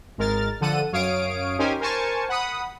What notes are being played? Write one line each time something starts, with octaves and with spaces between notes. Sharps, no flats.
G#1 G#3 A#4 F6 A6
D3 F3 A4 F#5 D#7
F#2 C#5 F5 D#6 D7
C#4 D#4 G4 A#4 C5 G#5
A#4 C5 G#5 A5 C#6
F#5 B5 D#6